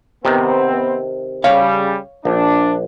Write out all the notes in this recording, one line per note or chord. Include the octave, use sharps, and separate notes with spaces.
C3 D#3 B3 C4
C#3 G3 C#5 F5
A#1 D4